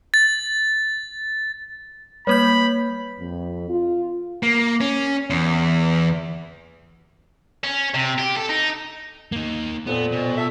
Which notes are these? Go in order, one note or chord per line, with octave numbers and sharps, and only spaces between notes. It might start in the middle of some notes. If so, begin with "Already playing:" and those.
A6
G3 A#3 B4 C#5 B5 G6
F2
F4
A#3
C#4
E2
C#4
C3
G4
A4
D#4
A#3 D#4
F2 A#2 B3
B2
A4 E5